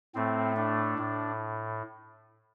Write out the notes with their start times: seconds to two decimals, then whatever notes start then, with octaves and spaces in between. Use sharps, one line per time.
0.15 A2 A3 C4
0.56 D4
0.98 A2